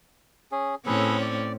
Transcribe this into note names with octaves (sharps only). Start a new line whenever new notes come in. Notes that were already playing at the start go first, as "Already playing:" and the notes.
C#4 G#4
A2 C4 C#4 G#4 A4 B4
D5